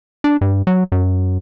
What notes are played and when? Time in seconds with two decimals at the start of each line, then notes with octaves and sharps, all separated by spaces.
0.24 D4
0.41 G2
0.67 F#3
0.92 F#2